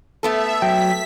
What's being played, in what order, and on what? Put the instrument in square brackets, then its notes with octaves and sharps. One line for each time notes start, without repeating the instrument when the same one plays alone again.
[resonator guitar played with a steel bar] A3 B3 A4 [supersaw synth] E5
[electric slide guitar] F#3 [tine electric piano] G5 [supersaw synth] B6